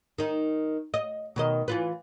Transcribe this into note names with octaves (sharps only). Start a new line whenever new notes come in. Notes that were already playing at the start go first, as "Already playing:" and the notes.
D#3 D#4
D#5
B2 D#3 D#5
E3 F4 B4